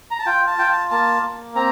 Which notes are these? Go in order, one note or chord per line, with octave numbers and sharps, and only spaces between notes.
A#5
A5
F4 G5
A5
F4 G5
A5
A#3 A5
A#3
C4 A#5